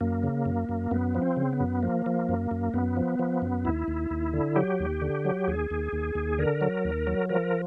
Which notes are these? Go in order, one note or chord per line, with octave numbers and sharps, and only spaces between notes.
F#2 A#3
C#3
F#2
F#2
F#2 B3
F3
C4
C#3
B3
F#2
F3 A#3
F3
F#2
F#2
F#2 B3
F3
F3
F#2
D#2 E4
D#2
D#2
D3
F#3 G4
D#2
D3
F#3
D#2 G#4
D#2
D#2
D#2
D3 A#4
F#3
D#2
F#3
F3 A#4